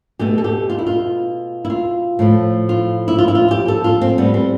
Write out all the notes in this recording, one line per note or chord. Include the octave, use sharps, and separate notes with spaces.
B2 A3 G4
A4
G4
F4
E4
F4
E4
F4
A2 F3 A3
F4
E4
F4
E4
F4
G4
A4
F4
C4
A2 G3 B3
C4